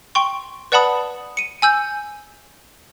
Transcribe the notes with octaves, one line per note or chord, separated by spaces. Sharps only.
G5 C6 C#6
B4 D5 F#5 A5 B5 D#6
C#7 D#7
G#5 E6 G6